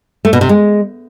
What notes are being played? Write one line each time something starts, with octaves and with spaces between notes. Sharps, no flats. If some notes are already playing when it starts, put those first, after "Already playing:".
A3
B2
C3
G#3